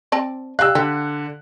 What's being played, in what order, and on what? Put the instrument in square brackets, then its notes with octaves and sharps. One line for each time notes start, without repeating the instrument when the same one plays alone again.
[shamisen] C4 D5 A5
[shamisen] G3 F5 [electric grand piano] E6 F#6
[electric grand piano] D3 [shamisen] G4